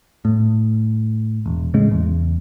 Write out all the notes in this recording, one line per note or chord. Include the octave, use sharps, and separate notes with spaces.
A2
E1
A2 C#3 G#3
E2